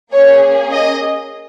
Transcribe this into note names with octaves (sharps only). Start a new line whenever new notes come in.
A#3 C#4 G#4 C#5
D#5